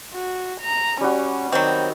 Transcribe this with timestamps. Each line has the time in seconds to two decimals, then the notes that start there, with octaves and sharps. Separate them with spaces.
0.14 F#4
0.61 A#5
1.01 G3 C#4 F#4
1.52 D#3 F#3 C4